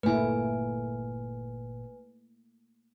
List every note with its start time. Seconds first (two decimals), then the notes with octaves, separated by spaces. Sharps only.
0.03 G1 A#2 A3 A#3 E4 B4 G#5